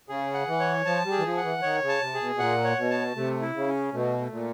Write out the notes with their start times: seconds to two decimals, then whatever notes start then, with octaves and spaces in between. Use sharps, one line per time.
0.09 C#3 G#4
0.34 F#5
0.47 E3
0.60 C#5
0.85 F3 A5
1.05 G3
1.11 G#4
1.19 E3
1.24 F3
1.37 F#5
1.43 E3
1.62 D#3 C#5
1.82 C#3
1.89 A5
2.01 C3
2.14 G#4
2.20 B2
2.36 B2
2.39 A#2 F#5
2.64 C#5
2.78 B2
2.90 A5
3.16 C3 A3
3.41 E4
3.55 C#3
3.67 C#4
3.93 B2 A3
4.19 A3
4.32 A#2